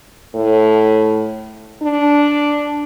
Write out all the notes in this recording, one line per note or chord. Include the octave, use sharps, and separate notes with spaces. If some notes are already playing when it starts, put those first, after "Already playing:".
A2
D4